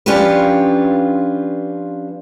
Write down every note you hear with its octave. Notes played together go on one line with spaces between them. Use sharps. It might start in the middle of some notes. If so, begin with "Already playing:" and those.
F3 C#4 D4 F4 G4 B4